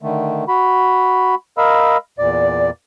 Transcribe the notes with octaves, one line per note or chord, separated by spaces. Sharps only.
D3 D#3 A3
F#4 B5
A#4 D#5 F5 B5 E6
E2 A#2 D5